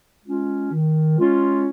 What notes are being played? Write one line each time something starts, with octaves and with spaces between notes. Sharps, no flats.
G#3 C#4 F4
D#3
G#3 C#4 F4